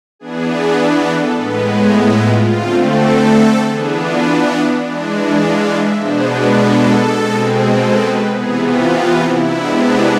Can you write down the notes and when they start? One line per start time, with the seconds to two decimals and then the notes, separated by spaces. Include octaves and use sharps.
0.19 E3 B3 D4 G#4
0.49 G#4
1.07 A4
1.36 A2 G#3 B3 B4
1.65 G#4
1.93 E4
2.23 F4
2.52 D3 A3 C4
2.80 A4
3.67 E3 B3 D4 G#4
3.96 F4
4.83 E3 G#3 D4
5.41 F5
5.70 E5
5.99 B2 G#3 B3 D4 C5
6.28 B4
6.57 A4
7.15 B2 G#3 C4
7.44 G#4
7.73 A4
8.01 B4
8.31 C3 E3 B3 G#4
8.60 F4
9.18 E4
9.47 C3 G#3 B3 D4
9.75 E4